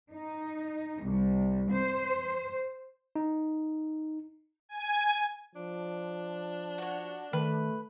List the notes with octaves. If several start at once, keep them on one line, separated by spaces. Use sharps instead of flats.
D#4
C2
C5
D#4
G#5
F3 D4
F#4 C#5
D#3 A3 B4